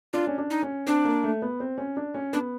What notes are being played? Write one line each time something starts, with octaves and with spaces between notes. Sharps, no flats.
D4 F4
C#4
D4
D#4
C#4
C4 D4
A#3
A3
B3
C4
C#4
D4
C#4
B3 D4